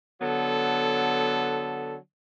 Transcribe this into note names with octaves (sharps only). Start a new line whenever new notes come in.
D3 F#3 B3 A4